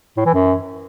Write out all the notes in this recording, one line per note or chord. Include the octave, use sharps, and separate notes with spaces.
A2
E3
F#2